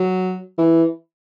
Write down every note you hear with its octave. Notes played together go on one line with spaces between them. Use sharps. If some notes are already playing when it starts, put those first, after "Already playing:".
Already playing: F#3
E3